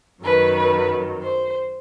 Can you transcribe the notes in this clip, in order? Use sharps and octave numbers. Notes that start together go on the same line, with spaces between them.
F#2 D#3 F#3 B4
B4
C5